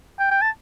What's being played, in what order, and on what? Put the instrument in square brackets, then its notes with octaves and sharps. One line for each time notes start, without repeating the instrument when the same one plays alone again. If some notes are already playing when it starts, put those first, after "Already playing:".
[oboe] G5
G5
A5